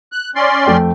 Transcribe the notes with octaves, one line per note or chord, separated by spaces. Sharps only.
F#6
C#4 D5 C6
F2 A3 G5